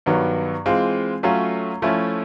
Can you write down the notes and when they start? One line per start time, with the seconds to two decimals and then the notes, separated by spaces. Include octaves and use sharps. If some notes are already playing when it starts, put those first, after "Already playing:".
0.06 G2 D#3 F#3 B3
0.66 E3 G#3 C4 F4
1.23 F#3 A3 C#4 F4
1.82 F3 A3 C#4 E4